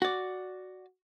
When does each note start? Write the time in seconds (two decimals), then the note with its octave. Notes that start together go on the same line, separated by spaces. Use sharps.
0.02 F#4 D5